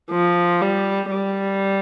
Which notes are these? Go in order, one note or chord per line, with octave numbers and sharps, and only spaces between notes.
F3
G3
G3